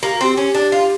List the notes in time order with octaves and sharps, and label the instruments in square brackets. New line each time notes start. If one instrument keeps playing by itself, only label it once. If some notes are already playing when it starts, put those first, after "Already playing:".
[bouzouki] A#3 [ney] G4
[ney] F#4
[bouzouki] C4 [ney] G4
[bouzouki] C#4
D4
F4